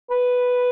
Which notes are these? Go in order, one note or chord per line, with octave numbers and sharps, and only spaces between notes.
B4